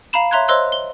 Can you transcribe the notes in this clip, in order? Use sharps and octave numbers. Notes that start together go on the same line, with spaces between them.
F5 A#5 B5 E7
C#5 E5 A#5 C6 F#6 G#6
C5 C#5 D#5 C6 E6 F#6
G7